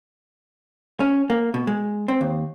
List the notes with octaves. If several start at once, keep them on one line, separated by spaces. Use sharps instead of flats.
C#4
A#3
B2
G#3
C4
D#2